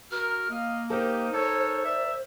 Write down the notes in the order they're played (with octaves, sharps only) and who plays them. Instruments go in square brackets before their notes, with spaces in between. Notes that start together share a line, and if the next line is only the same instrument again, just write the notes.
[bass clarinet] F#4 [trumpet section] A#4 [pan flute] F6
[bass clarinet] A#3 [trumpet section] D#5 F5
[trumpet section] D#4 G4 [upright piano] A#4 [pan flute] C5
[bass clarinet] D#4 [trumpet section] A4 C#5
[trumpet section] D5 E5